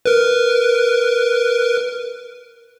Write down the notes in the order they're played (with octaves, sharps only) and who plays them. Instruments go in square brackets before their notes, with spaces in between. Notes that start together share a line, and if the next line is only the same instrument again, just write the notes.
[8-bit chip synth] A#4 B4